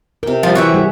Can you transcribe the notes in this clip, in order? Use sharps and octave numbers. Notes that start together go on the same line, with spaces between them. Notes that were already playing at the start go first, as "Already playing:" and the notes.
C3 A#4 G5
F3 G3 F4
E3 C4 F#4 C#5 E5
G3 G#4